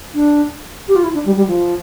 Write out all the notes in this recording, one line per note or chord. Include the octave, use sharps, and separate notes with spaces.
D4
G4
F4
E4
D4
G3
G3
F3